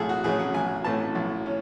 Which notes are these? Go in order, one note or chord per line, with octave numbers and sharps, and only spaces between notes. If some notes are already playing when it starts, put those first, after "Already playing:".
Already playing: B1 A2 E3 A3 G#4 A4
F#4
A2 E3 A3 C#4 G#4
F#5
B1 G#5
A2 E3 A3 C#4 A5
B1
C#4